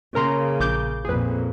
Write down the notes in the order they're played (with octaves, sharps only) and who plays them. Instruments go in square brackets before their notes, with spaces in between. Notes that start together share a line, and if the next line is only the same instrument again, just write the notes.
[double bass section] C#3 A#3 [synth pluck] A#4 A#5 C6
[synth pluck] A#1 D6 G6
[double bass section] F2 A#2 [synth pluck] G#4 B4